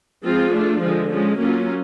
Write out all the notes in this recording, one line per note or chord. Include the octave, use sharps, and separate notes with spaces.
F3 G#3 C4 F4 G#4
A3 D4 F4
D3 F3 G#3
F3 G#3 C#4
F#3 A#3 C#4 F4